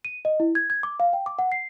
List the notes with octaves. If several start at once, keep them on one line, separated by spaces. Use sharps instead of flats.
D#7
D#5
E4
G#6
G#6
D6
F5
G5
D6
F#5
C7